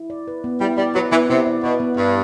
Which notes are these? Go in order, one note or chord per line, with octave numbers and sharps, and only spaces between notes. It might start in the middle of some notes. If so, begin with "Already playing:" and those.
Already playing: E4
D5
B4
B3
G3 E4
G3 D5
F#3 B4
E3 B3
C3 E4
D5
B2 B4
B3
G2 B3